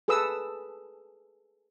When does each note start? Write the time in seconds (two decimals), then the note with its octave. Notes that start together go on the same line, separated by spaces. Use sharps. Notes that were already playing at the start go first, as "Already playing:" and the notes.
0.08 G#4 A4 B4 D#6 E6